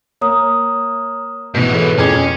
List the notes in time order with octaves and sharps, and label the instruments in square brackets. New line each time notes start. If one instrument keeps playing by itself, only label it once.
[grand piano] A#3 [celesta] C#5 A#5 D#6
[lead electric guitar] G#2 E3 [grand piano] B2 B3
[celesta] G#4 A4 C#5
[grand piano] F2 G#4 G#6 [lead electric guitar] C#4 [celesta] D6 C7